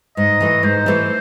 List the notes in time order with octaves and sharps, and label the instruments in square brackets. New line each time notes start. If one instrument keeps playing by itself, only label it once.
[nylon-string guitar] G#2 [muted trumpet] D#5
[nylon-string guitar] E3 A3
[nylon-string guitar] G#2 [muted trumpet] C5
[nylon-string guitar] E3 A3